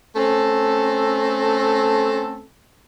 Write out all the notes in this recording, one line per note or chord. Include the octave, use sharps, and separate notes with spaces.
A3 C4 C#4 A4